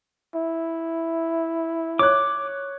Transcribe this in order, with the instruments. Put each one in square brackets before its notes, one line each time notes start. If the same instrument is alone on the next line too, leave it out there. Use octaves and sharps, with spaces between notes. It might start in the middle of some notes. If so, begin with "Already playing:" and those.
[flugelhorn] E4
[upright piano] C#5 F#6 [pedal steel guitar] D6